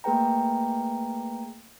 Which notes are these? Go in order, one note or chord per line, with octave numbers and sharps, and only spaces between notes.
A3 A#3 G#4 B4 G5 A#5